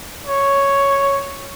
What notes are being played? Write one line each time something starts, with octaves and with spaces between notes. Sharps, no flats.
C#5